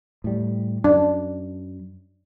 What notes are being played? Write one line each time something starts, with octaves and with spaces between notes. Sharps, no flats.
A2 G3
F#2 D4